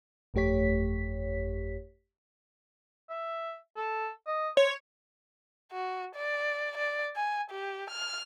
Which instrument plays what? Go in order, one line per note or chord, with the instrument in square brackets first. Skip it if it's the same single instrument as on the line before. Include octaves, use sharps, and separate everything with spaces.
[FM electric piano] G1 F2 A3 G4 C#5 B6
[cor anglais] E5
A4
D#5
[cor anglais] C5 [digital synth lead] C#5
[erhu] F#4
D5
D5
G#5
G4
F6